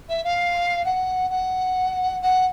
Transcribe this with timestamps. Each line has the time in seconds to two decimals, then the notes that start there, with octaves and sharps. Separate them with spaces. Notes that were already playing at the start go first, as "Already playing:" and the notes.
0.09 E5
0.24 F5
0.85 F#5
1.30 F#5
2.21 F#5